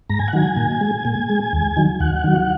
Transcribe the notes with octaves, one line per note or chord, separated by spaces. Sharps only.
G#2 A#5
G#5
F#5
D#3 F#3 G#5
A#2
G#3
A#2
G#3
D#2
D#3 F#3
D#2 F#5
D#3 F#3